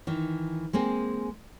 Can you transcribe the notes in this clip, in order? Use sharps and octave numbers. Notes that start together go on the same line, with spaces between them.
D#3 E3
G#3 A#3 C4 G#4